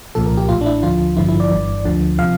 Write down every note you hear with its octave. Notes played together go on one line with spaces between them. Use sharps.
C2 A#2 F3 A4
A#4
G4
A1 A2 E3 F4
D4
E4
D2 D3 F3 F4
A1 G2 D3 F3 E4
E4
D5
G1 G2 E3
D2 D3 F3
C3 F3 F5